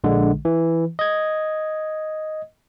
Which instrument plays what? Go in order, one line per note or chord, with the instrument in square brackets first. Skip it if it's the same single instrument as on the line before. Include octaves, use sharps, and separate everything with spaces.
[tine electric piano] A#1 D3 G#3
E3
D#5 G#6